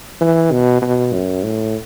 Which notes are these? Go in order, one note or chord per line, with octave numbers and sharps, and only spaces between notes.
E3
B2
B2
F#2
A2